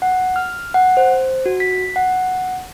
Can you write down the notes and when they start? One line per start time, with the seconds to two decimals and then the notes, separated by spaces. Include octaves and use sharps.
0.02 F#5
0.36 F6
0.74 F#5
0.97 C5
1.46 F#4
1.60 B6
1.96 F#5